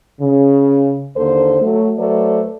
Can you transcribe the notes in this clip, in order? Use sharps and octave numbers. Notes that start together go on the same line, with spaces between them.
C#3
D#2 D3 A#3 A4 C5
F#3 A3
F#3 A3 A4 B4 C5 D5